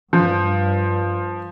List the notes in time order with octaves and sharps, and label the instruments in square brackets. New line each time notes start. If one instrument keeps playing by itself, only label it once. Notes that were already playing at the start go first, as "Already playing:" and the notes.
[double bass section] G2 [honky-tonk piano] F3